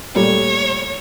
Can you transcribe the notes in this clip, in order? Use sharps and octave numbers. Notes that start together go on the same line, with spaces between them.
A#2 G3 A3 C#5